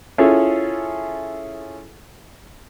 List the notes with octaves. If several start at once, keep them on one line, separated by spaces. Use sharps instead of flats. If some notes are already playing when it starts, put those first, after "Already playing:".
C#4 E4 F4 G#4 A4